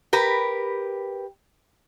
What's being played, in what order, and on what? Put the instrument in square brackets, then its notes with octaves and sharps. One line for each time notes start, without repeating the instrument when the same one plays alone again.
[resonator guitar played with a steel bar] G4 A#4 B4